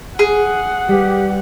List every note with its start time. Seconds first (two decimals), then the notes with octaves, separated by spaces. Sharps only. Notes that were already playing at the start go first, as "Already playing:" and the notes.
0.19 G#4 F#5
0.88 G3 G4 B4